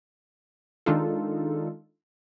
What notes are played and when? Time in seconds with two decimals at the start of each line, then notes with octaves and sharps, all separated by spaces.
0.86 D#3 G#3 D4 D#4 F4 A4